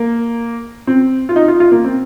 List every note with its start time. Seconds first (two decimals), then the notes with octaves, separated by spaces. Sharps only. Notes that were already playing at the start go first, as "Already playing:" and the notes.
Already playing: A#3
0.87 C4
1.29 F4
1.36 D#4
1.48 F4
1.60 F4
1.72 A#3
1.85 C4